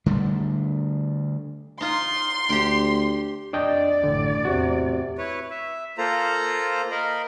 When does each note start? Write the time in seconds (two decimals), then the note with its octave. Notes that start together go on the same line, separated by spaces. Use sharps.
0.06 D3 G3 A3
1.81 D#4 F4 C6
2.49 D2 G4 G5
3.53 F2 D4 D5 D#5 G5
4.04 A1 F#2 D3
4.45 E2 A2 C3 F#4
5.18 E4 B4 C#5
5.51 E5
5.98 A#3 F4 A4 C5 A#5
6.91 A#4 D#5 F5 B5